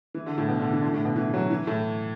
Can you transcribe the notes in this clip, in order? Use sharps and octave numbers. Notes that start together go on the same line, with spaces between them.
E3
D3
A2
B2
D3
E3
D3
A2
B2
E3
F#3
E3
A2